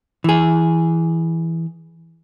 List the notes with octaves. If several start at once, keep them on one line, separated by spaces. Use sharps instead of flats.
E3 G#4